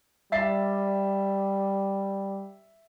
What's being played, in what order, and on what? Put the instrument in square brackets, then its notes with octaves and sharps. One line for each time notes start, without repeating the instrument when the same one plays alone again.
[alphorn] G3 [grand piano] E5 A6 C7